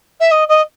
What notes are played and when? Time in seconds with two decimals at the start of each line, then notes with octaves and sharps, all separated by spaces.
0.20 E5
0.31 D#5
0.48 D#5